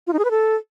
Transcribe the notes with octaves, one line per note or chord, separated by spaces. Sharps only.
F4
D#4
G#4
B4
A4